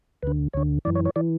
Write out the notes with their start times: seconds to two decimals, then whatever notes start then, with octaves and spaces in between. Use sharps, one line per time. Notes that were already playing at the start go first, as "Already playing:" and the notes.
0.23 D2 D3 B4
0.53 D2 D3 C#5
0.85 F#2 E3 D5
0.95 C#5
1.05 C#5
1.16 E3 D5